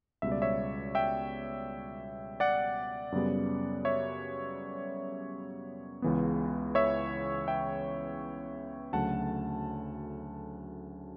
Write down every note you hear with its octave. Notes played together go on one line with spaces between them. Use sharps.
C#2 B2 G3 E5
D5
C#5 E5
E5 G5
D5 F#5
F#2 C#3 G3 B3
C#5 E5
C#2 C#3 E3 B3
C#5 E5
E5 G5
D2 C#3 F#3 A3 F#5 A5